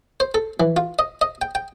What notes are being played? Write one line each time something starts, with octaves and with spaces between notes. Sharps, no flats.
C5
A4
E3
F4
D#5
D#5
G5
G5